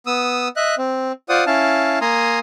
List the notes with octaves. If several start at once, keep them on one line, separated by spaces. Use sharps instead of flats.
B3 D#6 E6
D#5 E5 F#6
C4
F4 C5 D5 F#5 D#6
C#4 E4 F5 A5
A#3 G#5 A#5 C6 D#6